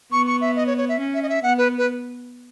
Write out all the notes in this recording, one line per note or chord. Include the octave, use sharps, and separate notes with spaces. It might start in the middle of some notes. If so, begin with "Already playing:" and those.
B3 C#6
C#6
E5
D#5
C#5
C#5
E5
C#4
E5
D#5
E5
B3 F#5
B4
B4